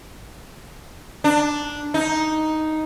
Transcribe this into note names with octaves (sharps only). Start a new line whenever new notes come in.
D4
D#4